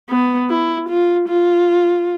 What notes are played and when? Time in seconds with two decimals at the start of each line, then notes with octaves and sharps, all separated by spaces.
0.10 B3
0.50 E4
0.89 F4
1.28 F4